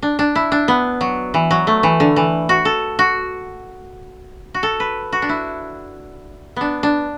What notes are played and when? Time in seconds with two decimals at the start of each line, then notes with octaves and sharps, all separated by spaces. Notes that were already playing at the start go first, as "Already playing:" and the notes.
0.02 D4
0.19 D4
0.35 E4
0.52 D4
0.68 B3
1.01 F#3
1.34 E3
1.51 F#3
1.67 A3
1.83 E3
2.00 D3
2.16 E3
2.49 F#4
2.65 A4
2.99 F#4
4.54 F#4
4.63 A4
4.80 B4
5.13 F#4
5.22 D4
5.29 E4
6.56 B3 D4
6.83 D4